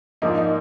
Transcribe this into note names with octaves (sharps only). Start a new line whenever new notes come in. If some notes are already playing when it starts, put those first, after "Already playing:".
G#2 F3 A#3 D4 D#4
D#4